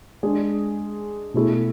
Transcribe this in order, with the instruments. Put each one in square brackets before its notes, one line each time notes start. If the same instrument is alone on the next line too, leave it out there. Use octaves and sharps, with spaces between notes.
[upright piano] G#3 D4 G#4
B2 A3 E4 G#4